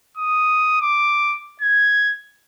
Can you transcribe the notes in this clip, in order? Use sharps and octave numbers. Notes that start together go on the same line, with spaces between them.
D#6
D6
G#6